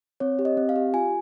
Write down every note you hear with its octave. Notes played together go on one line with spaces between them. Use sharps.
C4 C#5
G4
D#5
C4
F5
G4
F4 G#5